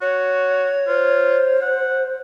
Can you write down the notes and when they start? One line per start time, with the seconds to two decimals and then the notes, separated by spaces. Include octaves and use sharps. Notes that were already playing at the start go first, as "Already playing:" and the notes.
0.02 F#4 C#5
0.88 F4 C5
1.62 F#5